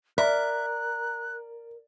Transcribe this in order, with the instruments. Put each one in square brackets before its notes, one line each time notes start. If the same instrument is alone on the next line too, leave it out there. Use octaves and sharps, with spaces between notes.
[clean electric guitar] A#4 [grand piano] D5 [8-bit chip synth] E5 [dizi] F#6